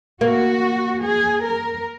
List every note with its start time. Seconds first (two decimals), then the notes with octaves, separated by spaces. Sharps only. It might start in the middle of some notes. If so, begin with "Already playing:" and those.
0.21 A#3 F#4
1.03 G#4
1.44 A#4